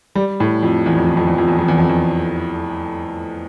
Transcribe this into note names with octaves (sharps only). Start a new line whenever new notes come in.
G3
A2
F2
E2
F2
E2
F2
E2
F2
E2
F2
E2
F2
E2